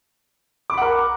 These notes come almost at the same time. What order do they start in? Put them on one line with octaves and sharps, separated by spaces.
D6 B5 F#5 A#4